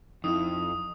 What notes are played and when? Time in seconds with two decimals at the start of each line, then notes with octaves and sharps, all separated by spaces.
0.24 F2 D#4 E4 D#6